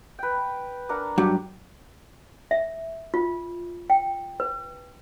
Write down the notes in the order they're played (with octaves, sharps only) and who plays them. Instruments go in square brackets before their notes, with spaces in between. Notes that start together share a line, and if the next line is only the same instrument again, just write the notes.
[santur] B4 G5
D4 A#4 F#5
[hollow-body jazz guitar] G2 F#3 [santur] G4
[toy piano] E5
F4
G5
B4